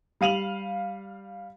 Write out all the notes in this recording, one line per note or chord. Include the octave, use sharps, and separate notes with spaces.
G3 F5 D#7 F7 F#7